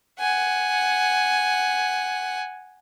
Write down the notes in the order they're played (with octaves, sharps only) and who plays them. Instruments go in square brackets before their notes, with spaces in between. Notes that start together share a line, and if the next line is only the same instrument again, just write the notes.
[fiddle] F#5 G#5